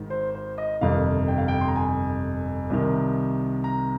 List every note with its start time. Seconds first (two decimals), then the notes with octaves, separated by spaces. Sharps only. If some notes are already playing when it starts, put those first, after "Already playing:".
Already playing: G#1 G#2 D#3
0.10 C5
0.35 C5
0.58 D#5
0.81 G1 F2 C3 D#3 F5
1.28 G5
1.38 F5
1.48 G5
1.61 C6
1.68 A#5
1.76 G#5
2.70 C2 C3 D#3
3.64 A#5